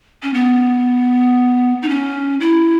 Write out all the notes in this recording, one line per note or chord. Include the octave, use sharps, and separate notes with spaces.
C#4
B3
D#4
C#4
E4